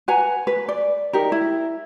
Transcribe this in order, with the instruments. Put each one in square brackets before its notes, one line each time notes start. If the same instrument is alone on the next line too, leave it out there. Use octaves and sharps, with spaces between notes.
[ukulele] B4 F#5 G#5 A#5
B4
D5
D#4 G4 A#4
E4